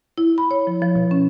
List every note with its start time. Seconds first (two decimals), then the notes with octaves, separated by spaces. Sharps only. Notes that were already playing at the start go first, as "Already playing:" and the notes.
0.18 E4
0.38 B5
0.51 C#5
0.67 F3
0.82 F3
0.96 B2
1.11 C#4